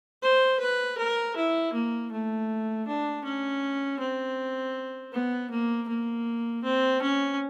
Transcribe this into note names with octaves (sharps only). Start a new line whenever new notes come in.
C5
B4
A#4
E4
A#3
A3
D4
C#4
C4
B3
A#3
A#3
C4
C#4